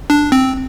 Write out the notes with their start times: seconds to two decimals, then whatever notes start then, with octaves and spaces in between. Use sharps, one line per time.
0.10 D4
0.32 C4